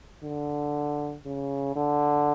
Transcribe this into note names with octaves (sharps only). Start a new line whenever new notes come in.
D3
C#3
D3